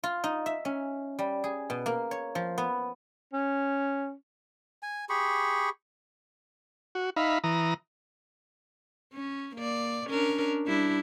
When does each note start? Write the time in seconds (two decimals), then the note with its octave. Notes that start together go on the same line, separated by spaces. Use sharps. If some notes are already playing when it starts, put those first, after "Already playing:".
0.04 F4
0.24 D#4
0.46 E5
0.65 C#4
1.19 G3
1.44 G#4
1.70 B2
1.86 A#3
2.11 C#5
2.35 F3
2.58 B3
3.33 C#4
4.83 G#5
5.09 G4 G#4 B5 C#6
6.95 F#4
7.16 D#4 E5 F5 B5
7.44 E3 A#5 D#6
9.13 C#4
9.56 A#3 D5
10.08 C#4 D4 A#4
10.66 G3 D4 E4